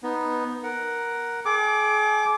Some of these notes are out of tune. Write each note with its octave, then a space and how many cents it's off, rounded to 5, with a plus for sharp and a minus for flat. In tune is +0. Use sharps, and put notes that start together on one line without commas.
B3 +0 D#4 +0
A#4 +5 F#5 +0
G#4 +40 G5 +20 D6 +0